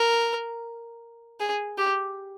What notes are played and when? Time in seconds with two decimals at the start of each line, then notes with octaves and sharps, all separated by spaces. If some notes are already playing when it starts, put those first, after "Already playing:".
Already playing: A#4
1.40 G#4
1.78 G4